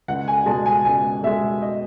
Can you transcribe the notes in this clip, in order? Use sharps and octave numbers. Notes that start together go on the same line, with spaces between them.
C#2 F#5
G#5
B2 G#3 A5
G#5
C#2 G#5
B2 G#3 E5
D#5